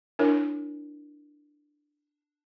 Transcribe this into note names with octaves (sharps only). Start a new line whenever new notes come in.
D4 E4 A#4 C#5